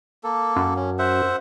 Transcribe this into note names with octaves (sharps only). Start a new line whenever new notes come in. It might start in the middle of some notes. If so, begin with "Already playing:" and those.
A#3 A4
F#2
C#4
C5 E5 F#5